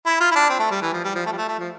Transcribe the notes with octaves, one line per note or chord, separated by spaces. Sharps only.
E4
F4
E4
D4
C4
A3
G3
E3
F3
G3
F3
A3
G3
A3
A3
F3